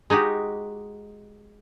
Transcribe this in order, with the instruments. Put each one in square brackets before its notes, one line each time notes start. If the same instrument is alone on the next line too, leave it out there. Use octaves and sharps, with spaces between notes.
[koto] G#3 D#4 F#4 G4